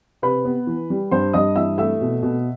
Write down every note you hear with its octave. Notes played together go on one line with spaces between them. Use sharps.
C3 B4 B5
B3
E3
G3
G2 C5 C6
G2 D#5 D#6
E3 E5 E6
A3 E5 E6
B2
B2